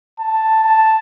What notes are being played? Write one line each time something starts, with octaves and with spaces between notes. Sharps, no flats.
A5
A5